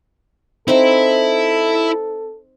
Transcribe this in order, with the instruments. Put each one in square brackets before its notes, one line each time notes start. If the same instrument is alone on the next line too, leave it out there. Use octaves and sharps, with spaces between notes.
[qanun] C4 D#4 [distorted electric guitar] E4 E5 [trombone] A4